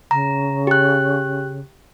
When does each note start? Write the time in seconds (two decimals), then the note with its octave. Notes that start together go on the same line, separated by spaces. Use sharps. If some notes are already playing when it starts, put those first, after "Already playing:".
0.11 C#3 A#5
0.67 G4 F#6